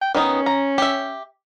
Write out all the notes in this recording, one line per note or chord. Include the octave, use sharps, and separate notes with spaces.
G5
D#3 B3 C#4 D#4
A#5
G4 E5